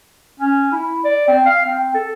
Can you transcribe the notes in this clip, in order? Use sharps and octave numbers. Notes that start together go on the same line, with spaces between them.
C#4
E4
D5
C4
F5
C4
A4